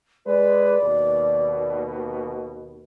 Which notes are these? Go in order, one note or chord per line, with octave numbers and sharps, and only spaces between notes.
G#3 B4 D5
D#2 B2